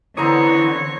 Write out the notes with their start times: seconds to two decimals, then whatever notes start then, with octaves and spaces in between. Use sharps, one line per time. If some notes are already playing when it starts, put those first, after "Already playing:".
0.17 D3 E3 B3 C4 E4 C#5 A#5 D#6